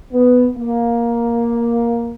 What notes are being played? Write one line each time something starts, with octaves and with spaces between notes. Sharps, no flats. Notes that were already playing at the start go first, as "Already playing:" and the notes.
B3
A#3